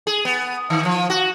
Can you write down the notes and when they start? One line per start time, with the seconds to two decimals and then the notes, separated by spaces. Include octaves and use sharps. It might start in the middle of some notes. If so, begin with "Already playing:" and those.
0.07 G#4
0.25 B3
0.70 D#3
0.85 F3
1.10 F#4